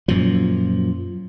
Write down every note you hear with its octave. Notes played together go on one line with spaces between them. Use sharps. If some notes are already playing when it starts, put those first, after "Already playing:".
F#2 A#2 F3